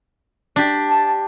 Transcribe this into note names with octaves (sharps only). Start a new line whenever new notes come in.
D4 G4
A5